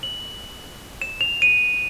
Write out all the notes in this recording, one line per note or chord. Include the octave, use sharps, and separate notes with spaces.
F#7
E7
F7
D#7